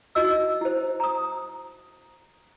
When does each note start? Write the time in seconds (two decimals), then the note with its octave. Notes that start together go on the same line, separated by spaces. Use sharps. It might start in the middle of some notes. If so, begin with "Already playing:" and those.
0.15 D#4 E4 F#4 D#5 E6
0.61 E4 C5
1.00 A#5 D#6